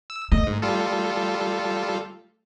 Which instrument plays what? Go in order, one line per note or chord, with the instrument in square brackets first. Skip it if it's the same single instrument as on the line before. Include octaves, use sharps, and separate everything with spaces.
[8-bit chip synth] E6
[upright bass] A3 [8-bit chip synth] D#5
[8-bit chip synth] G#2
G3 F4 A4